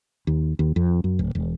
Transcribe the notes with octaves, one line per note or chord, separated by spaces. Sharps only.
D#2
D#2
F2
F#2
D1
E1